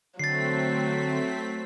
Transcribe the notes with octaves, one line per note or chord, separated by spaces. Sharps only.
D3 F#3 A3 C4 A6 B6 C7